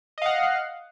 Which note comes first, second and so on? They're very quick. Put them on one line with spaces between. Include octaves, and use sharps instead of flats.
D#5 F5 F#5